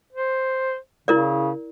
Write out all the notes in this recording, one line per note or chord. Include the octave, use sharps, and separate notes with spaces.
C5
C#3 E4 A#4 D5